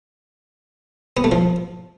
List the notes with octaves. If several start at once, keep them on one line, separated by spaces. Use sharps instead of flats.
B3
A3
F3